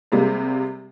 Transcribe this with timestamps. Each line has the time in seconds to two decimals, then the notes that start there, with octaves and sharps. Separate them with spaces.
0.12 C3 G3 G#3 A#3